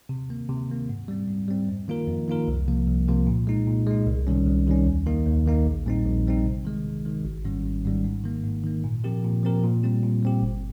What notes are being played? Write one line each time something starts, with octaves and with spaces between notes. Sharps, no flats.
C3
D#3 A#3
C3
D#3 A#3
G#2
G3 C4
G#2
G3 C4
F2
D#3 A#3 F4 A#4
F2
D#3 A#3 F4 A#4
C2
C3 F3 A#3
C2
C3 F3 A#3
A#2
G#3 D#4
A#2
G#3 D#4
C2
C3 D#3 G3 C#4
C2
C3 D#3 G3 C#4
D#2
D#3 A#3 D#4
D#2
D#3 A#3 D#4
A#1
A#2 G3 C4 D#4
A#1
A#2 G3 C4 D#4
C3
D#3 G#3
C3
D#3 G#3
G#1
G#2 D#3 G3 C#4
G#1
G#2 D#3 G3 C#4
G#2
D#3 A#3
G#2
D#3 A#3
A#2
F3 C4 G4 A#4
A#2
F3 C4 G4 A#4
A#2
G3 C4 G4
A#2
G3 C4 G4
G1